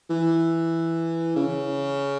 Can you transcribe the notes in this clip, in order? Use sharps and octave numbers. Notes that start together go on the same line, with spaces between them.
E3
C#3